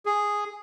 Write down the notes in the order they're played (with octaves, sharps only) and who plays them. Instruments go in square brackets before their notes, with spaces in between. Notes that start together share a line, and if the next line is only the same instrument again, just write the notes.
[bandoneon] G#4